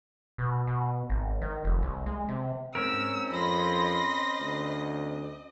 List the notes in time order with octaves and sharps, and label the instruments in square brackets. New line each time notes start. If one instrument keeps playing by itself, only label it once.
[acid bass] B2
B2
G#1
D#3
F1
C2
G#3
C3
[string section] G#2 [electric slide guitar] C4 C#4 A#4 [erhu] E6
[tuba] F2 [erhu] D#5 [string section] B5 C6 A#6
[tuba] D2